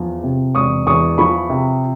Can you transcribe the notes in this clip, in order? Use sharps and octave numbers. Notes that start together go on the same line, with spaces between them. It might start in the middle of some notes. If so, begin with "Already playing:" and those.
Already playing: E2 F3
C3
E1 C#6 D#6
E2 C#6 D#6
F3 B5 C#6
C3